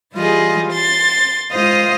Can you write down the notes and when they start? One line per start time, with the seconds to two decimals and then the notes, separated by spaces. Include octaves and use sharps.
0.13 E3 G3 F4 G#4 D#5
0.71 C6 A6
1.51 G#3 F4 C5 D#5 F5 D#6